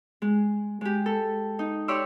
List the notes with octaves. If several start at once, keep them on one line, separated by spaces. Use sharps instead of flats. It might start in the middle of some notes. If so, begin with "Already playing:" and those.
G#3
G#3 G4
A4
D#4
G4 C#5 D5 C6 D6 E6